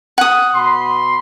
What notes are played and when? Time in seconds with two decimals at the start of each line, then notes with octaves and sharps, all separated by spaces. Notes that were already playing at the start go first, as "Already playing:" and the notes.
0.18 F#5 D#6
0.55 B2 B5 C6